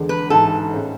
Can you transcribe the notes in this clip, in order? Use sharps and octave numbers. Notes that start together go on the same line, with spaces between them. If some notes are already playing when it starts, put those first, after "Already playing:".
Already playing: E2 D3 G#3
B4
A1 G#2 E3 A4
A2 G#3 C#4